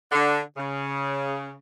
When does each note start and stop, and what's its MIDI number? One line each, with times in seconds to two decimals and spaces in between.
0.12 0.40 50
0.57 1.55 49